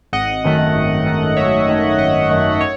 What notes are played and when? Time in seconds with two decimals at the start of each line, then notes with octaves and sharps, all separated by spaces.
0.13 G#1 D#5 F#5
0.44 F#2 D#3 A3
0.75 G#1
1.06 F#2 D#3 A3
1.37 G#1 C#5 E5
1.68 F#2 D#3 A3
1.99 G#1 D#5
2.29 F#2 D#3 A3
2.61 C#5